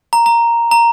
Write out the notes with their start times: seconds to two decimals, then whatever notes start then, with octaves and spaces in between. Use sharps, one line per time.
0.13 A#5
0.26 A#5
0.71 A#5